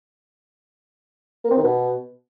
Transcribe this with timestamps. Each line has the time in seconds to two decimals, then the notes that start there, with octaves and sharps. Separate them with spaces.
1.44 A#3
1.51 C4
1.57 D#3
1.64 B2